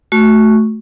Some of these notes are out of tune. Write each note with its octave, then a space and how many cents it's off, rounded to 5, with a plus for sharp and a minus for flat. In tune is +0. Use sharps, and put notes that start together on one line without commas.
A3 -15 F#4 +0 C#6 +0